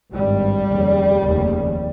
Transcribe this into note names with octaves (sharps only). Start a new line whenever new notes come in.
G#1 G2 G3
F1 D#2 C#3
F1 D#2 C#3